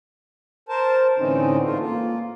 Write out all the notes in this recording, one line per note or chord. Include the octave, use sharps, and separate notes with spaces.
A#4 C5 A5
A2 D3 E3 C4 C#4 D#4
G#2 A3 F4
A#3 F4